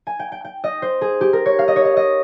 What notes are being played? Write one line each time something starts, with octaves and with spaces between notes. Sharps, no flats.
G#5
G5
G5
G5
D#5
C5
G#4
G4
A#4
C#5
F5
D#5
C#5
D#5
D#5